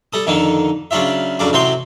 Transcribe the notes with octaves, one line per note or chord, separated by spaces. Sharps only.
G3 A4 D#6
F2 D3 D#3 D#4
C#3 F#3 D4 F4 E5
F2 C#3 F#3 D4 D6
A1 C3 F#3 C4 G5 C6